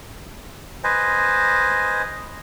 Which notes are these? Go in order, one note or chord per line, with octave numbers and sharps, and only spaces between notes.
B4 C5 D#5 G#5